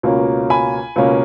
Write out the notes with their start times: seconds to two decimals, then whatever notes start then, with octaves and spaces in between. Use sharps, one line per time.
0.03 C#2 B2 A#3 C#4
0.50 G#5 B5
0.96 C#2 B2 A#3 C#4